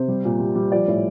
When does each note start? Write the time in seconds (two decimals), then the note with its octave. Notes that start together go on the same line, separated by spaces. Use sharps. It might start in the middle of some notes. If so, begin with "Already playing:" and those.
Already playing: C3 C5
0.08 G3
0.25 A#2
0.40 G3
0.55 G3
0.72 F3 D5
0.88 A2